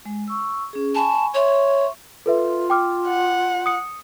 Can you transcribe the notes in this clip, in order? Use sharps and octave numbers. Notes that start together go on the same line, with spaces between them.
G#3
C#6 E6
C#4 G#4
G#5 A5 B5 C#6
C#5 E5 C6 C#6
F4 A4 B4 E5
G5 D6 F6
F#5
D#6 C#7